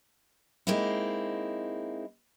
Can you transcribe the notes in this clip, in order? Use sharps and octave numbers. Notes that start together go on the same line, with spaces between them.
G#3 A#3 C4 D#4 E4